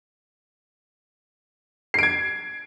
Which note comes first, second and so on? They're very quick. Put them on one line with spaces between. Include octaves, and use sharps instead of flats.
C7 D7 G#6